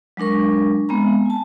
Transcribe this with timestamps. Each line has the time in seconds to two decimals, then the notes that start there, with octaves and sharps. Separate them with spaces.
0.17 F#3 G#3 D4 A#4 C#6
0.89 G#3 B3 C4 A#5
1.26 G#5 A5